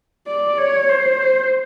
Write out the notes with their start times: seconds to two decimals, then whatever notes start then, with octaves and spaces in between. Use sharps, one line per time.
0.27 D5
0.58 C#5
0.89 C5